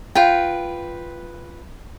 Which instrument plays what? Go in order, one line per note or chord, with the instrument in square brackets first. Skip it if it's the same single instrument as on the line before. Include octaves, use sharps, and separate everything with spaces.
[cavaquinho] F4 B4 G5